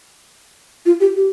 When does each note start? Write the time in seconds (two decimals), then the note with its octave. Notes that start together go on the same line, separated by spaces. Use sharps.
0.86 F4
1.00 G4
1.16 G4